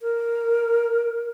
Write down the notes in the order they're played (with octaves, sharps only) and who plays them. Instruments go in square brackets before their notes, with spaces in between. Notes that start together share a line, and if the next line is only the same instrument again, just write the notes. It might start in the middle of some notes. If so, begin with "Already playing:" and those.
[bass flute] A#4